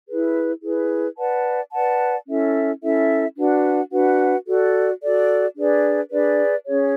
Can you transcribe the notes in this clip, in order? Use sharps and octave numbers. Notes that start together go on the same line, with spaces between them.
E4 G#4 B4
E4 G#4 B4
B4 D5 F#5 A5
B4 D5 F#5 A5
C#4 E4 A4 E5
C#4 E4 A4 E5
D4 F#4 B4 F#5
D4 F#4 B4 F#5
F#4 A4 D5
F#4 A4 D5
D4 G#4 B4 D5
D4 G#4 B4 D5
C#4 G#4 C#5